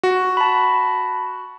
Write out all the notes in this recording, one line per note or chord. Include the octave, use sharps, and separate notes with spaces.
F#4
A5 B5